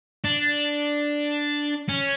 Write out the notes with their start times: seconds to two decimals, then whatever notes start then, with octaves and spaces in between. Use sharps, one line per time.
0.24 D4
1.89 C#4